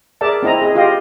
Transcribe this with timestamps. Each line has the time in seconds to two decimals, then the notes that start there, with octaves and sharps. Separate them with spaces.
0.21 G#4 A#4 D5 E5 A5
0.43 C4 E4 D#5 A#5
0.62 G#4 D#5
0.75 F4 G4 D#5 F5 G5